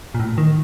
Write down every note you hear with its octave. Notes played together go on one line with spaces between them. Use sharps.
A#2
A2
D#3